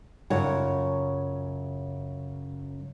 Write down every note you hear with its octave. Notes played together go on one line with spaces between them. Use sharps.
F#2 C#3 F4 C#5 F#5